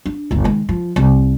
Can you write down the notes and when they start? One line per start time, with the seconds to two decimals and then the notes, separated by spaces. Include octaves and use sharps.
0.06 D4
0.31 G1 D2
0.44 D#3 G#3
0.69 F3
0.96 C2